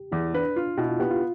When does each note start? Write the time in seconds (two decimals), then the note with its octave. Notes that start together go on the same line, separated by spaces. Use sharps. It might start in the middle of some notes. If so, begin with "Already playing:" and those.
Already playing: G4
0.12 E2 E4
0.34 D4 B4
0.56 F4
0.77 B2 E4
0.89 F4
1.00 B3 G4
1.10 F4